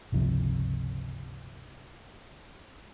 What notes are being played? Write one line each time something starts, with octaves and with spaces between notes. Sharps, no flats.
G1 C#2 C3 F3